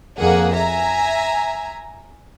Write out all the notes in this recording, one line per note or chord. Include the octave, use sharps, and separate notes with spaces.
F2 A#3 G#4 F#5
E5 G#5 A#5